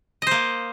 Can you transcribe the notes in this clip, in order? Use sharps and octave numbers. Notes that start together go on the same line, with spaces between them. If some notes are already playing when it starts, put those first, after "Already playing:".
A#3 C5 D#5